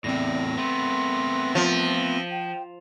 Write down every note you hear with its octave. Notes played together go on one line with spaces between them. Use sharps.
E2 A2 C4 D5 A#6
A3 B3 C6
F3 F4
G5